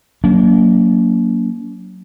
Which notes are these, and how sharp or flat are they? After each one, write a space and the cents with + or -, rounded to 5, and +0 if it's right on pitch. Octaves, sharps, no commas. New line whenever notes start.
F#3 +5 A#3 +0 D4 -45